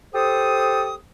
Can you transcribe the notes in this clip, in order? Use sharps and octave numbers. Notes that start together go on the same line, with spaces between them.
G4 A4 C5 D#6